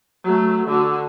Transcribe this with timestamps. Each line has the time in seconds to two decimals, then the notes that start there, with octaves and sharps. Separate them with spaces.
0.24 F#3 A3
0.67 D3 F#4